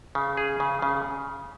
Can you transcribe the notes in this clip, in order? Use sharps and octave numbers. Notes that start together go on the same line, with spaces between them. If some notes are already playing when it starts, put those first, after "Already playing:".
C#3
G#4
C#3
C#3